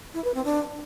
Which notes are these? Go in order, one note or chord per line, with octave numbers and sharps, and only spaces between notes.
E4
B4
C4
D4